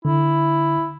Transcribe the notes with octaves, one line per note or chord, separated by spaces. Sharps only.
D3 E4